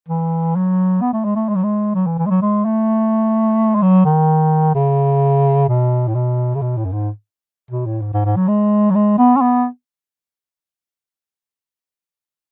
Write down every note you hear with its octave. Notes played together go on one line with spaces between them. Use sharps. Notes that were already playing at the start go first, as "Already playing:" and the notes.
E3
F#3
B3
A3
G#3
A3
G#3
F#3
G#3
F#3
E3
E3
G#3
F#3
G#3
A3
G#3
F#3
D#3
C#3
B2
A2
B2
C#3
B2
A2
F#2
G#2
B2
A2
G#2
G#2
G#2
F#3
G#3
F#3
G#3
B3
C#4
B3